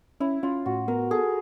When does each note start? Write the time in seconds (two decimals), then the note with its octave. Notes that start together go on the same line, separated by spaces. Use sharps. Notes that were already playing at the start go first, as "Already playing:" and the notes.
0.20 C#4 E4
0.43 C#4 F4
0.66 A2 F#4
0.88 B3 A#4
1.11 G#4 A4